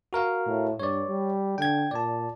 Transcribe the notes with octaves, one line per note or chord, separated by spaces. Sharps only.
F#4 A#4 F5
A2
G2 C#5 D5
G3
D3 G5 G#6
A#2 D5 A5